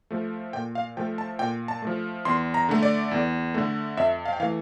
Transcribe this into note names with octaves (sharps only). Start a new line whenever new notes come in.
F3 A3
A#2 G5
F5
F3 A3 G5
A5
A#2 G5
A5
F3 A3
E2 C6
A#5
D3 A3
D5
E2
D3 A3
F2 E5
F5
G5
E3 A3 F5